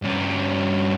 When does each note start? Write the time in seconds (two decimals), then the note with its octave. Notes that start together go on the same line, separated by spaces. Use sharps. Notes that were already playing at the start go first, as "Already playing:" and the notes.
0.02 G2 C#4